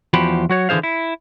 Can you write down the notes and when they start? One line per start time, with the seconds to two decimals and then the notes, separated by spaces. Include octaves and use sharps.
0.13 E2 F3 F#4 G4 C5 B5
0.50 F#3 F#4 C#5
0.69 D3 E3 D#4 G#4 C5 F5
0.83 E4